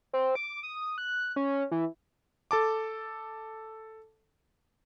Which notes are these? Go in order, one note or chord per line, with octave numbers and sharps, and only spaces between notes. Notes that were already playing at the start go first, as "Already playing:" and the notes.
C4
D6
D#6
F#6
C#4
E3
A4 A5 D6